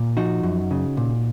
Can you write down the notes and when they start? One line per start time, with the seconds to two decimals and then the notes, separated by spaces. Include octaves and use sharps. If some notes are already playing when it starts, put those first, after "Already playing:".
Already playing: A#2
0.17 F3 D#4 F#4
0.43 F#2
0.71 C#3
0.97 A#2